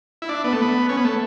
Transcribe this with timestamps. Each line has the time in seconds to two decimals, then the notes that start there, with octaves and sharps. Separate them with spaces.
0.22 E4
0.29 D4
0.44 B3
0.53 A3
0.62 B3
0.89 C#4
0.97 B3
1.04 A3